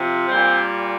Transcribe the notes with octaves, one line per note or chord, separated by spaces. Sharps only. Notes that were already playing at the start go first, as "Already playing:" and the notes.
Already playing: C3 F3
A#2 G3 C4